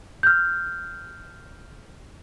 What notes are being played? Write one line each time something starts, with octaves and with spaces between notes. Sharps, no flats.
F6 G6